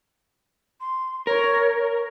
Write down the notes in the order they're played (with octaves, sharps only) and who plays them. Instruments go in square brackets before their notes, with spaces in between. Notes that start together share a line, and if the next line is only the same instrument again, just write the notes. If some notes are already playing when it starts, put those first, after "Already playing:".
[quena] C6
[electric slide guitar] A#4 [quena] C#5